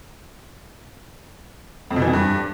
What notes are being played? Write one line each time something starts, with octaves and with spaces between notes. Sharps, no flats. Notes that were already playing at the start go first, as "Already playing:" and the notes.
F2
B2
E3
F2
G2